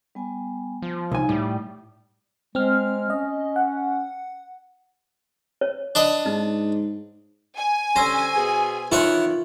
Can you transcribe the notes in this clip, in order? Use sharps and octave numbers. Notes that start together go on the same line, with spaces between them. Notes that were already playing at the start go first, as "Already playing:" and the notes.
G3 B3 G#5
F3
C2 D#4 C#5 G#5
A2 G3 D6
G#3 C4 F6
C#4 D#5
F#5
C#5
D4 B4 D#5
G#2 D#4
G#5
D3 G3 C#4 C5 E6 A#6
B2 B3 G#4
D#3 E3 E4 F4 C#5 F#5